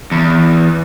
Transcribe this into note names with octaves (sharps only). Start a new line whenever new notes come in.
E2